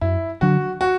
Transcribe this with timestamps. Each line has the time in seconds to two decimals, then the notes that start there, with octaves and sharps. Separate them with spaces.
0.01 F#2 E4
0.41 D3 F#3 D4 F#4
0.81 F#4